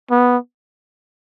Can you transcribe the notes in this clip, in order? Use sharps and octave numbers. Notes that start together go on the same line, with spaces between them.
B3